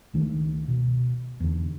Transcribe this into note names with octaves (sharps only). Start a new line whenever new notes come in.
C#2 D#3 A3
B2
E2 D3